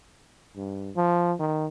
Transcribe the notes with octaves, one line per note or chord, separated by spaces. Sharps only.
G2
F3
D#3